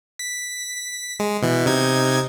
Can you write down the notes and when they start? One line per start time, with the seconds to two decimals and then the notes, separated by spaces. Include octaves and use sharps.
0.19 B6
1.20 G#3
1.42 B2 E3
1.66 C3 D#4 G#6